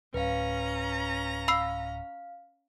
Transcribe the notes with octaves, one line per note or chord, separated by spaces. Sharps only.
D1 C#4 B4 F5 A#5
F5 B5 E6 C7